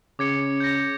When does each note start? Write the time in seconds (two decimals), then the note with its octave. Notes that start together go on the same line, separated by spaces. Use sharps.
0.19 C#3 D6 G#6 C#7
0.60 G6 A#6